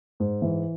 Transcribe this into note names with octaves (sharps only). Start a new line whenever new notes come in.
G#2
E3